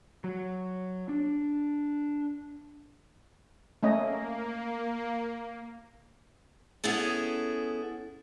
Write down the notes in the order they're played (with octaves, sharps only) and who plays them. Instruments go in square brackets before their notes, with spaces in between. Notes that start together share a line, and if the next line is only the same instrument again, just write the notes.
[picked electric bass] F#3
D4
[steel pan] A3 C#4 D#5 [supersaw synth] A#3
[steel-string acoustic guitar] B3 C#4 E4 G#4 A4